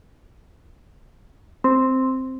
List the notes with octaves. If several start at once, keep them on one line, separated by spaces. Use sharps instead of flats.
C4